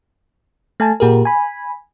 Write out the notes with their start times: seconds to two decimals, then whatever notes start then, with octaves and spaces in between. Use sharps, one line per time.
0.80 A3 G#5 A5
1.00 A#2 G4 G#4 A#4
1.25 G#5 B5